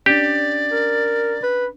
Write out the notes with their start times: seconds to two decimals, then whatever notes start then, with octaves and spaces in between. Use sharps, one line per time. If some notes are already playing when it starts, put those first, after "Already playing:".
0.06 C#4 D4 G4 D5
0.72 A#4
1.43 B4